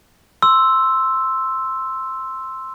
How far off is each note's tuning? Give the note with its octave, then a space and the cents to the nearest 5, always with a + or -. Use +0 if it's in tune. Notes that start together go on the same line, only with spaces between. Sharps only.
C6 +0 E6 +0